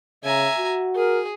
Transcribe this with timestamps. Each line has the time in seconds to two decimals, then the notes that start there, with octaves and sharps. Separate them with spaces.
0.24 C#3 E5 G#5 A#5
0.58 F#4
0.96 G#4 A#4